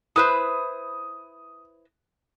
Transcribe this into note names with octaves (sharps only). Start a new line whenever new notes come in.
E4 B4 C5 D#6